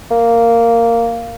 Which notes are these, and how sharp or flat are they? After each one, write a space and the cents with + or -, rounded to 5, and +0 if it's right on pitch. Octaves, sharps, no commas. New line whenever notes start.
A#3 -10